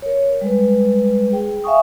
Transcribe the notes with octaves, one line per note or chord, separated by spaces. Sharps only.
A#4 C#5
G3 G#3 B4
G#4 G5
E5 F5 G#5 C#6 D#6